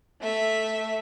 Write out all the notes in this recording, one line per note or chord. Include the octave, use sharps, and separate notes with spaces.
A3 E5